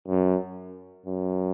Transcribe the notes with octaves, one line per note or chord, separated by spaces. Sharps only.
F#2
F#2